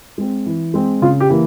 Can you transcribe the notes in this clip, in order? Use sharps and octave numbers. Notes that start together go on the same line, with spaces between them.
G#3 C4
E3
G#3 C4
C#3 F4
G4
E3 A#3